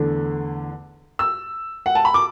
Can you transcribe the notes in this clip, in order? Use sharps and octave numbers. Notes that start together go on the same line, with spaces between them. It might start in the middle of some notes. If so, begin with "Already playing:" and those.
Already playing: E2 D3 A3 D4
E6
F#5
A5
B5
D6